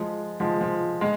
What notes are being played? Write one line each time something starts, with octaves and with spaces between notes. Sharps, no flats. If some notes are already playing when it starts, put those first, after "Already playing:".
Already playing: F3 G#3
F3 G#3
F3
G#3